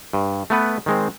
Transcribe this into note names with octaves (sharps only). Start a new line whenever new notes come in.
G2
A3 B3 B4
D#3 G#3 C4